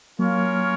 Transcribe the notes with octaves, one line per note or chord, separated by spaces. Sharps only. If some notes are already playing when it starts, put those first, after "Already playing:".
F#3 A#3 C#4 F4 A#4 C#5 F5